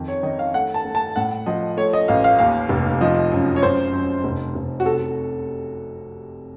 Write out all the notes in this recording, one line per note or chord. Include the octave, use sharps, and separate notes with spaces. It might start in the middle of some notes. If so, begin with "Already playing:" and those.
Already playing: F2 D#3
C#5
D#3 D#5
F5
A3 F#5
A5
A3
A5
A2 F#5
F3 D#5
A3 C#5
D#5
A1 F5
F5
D#2 F5
F1
F3 D#5
F#2
C#5
F#2 C5
F#2
F1
F1
F#4
C3 A4